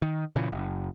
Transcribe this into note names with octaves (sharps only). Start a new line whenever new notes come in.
D#3
A#2 C#3 E3
F#1